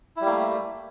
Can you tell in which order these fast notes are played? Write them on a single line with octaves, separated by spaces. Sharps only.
E4 G3 A#3 A3